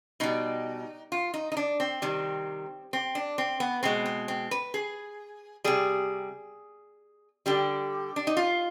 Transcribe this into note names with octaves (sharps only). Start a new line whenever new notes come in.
B2 G3 D#4
F4
D#4
D#4
D4
C4
C3 D#3 G3
C4
D4
C4
B3
B2 G#3 C4
C4
C4
B4
G#4
C3 G3 G#4
D3 G3 G4
D4
D#4
F4